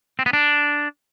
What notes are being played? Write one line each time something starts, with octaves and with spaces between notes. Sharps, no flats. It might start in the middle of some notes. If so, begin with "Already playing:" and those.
C4
B3
D4